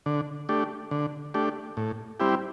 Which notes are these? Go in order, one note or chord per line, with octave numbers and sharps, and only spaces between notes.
D3
A3 D4 G4
D3
A3 D4 G4
A2
G3 C4 E4 G4